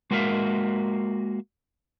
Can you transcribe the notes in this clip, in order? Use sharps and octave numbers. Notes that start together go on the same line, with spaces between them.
G#3 A#3 F#4 A#4 E5 F5